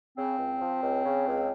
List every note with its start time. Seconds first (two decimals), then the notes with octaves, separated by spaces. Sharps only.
0.17 C#3 C4
0.39 C#2
0.61 F3
0.83 C#2
1.05 C#3
1.27 C#2